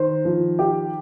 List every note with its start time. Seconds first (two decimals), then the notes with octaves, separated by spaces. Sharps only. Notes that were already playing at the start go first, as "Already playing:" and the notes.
Already playing: D#3 C5
0.25 F3
0.59 G4